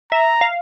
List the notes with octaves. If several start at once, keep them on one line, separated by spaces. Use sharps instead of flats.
E5 A#5
F5